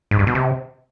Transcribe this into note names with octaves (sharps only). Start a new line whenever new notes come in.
G#2
G2
B2
C3